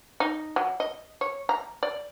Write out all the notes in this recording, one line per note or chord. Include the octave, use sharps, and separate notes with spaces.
D#4
F#3
D#5
C#5
A#5
D5